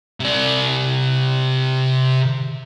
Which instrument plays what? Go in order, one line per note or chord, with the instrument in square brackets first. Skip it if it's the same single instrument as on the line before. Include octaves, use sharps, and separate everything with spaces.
[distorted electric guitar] C3 D5